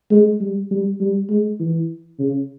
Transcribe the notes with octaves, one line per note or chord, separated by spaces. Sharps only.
G#3
G3
G3
G3
G#3
E3
C#3